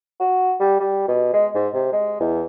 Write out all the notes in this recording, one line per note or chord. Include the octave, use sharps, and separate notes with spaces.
F#4
G3
G3
B2
G#3
G#2
C3
G#3
E2